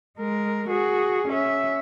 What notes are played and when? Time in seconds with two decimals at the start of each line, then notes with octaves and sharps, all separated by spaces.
0.18 G#3 A#4
0.69 F#4 G#4
1.29 C#4 E5